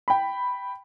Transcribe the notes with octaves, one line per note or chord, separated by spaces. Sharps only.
G5 B5